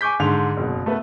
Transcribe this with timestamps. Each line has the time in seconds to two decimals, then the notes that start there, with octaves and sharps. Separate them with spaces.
0.01 G#5 C#6 D6 G6 B6
0.20 G#2 D3 C6 F7
0.57 F#1 B2
0.86 A3 B3 B4